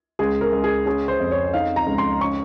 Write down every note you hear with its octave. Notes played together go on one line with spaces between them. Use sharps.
C#2 G#4
A#4
C#2
G#4
C#4 G#4
C5
F2
C#5
D#4 F5
A#5
C#2
C6
C#4 C#6